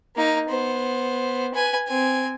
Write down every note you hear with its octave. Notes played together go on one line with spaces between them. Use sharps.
A#3 D#4
B3 C5
B4 G#5
C4 G#5